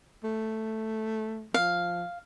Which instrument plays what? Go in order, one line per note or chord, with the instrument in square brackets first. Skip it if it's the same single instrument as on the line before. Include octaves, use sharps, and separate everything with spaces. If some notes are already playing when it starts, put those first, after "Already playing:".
[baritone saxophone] A3
[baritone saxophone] F3 [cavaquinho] F5